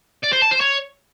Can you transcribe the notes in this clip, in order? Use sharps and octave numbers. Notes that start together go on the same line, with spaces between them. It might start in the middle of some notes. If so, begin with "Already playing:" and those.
D5
C5
A5
C5
C#5